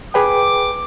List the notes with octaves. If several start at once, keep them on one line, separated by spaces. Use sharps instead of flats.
G#4 B4 G5 D6